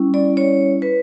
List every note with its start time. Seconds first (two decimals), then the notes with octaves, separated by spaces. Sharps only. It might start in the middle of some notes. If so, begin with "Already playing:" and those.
Already playing: G3 C#4 E4
0.14 D5
0.37 C#5
0.82 B4